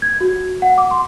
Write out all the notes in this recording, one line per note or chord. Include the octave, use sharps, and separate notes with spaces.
G#6
F#4
F#5
D6
C6